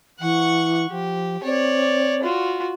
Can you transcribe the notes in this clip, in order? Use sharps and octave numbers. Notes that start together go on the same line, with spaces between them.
E3 F#5 C#6
F3 G4
C4 C#5 D5
F4 F#4